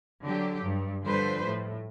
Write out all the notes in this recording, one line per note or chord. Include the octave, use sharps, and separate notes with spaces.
D3 F#3 G4
G2
D3 F3 G3 B4 C5
A2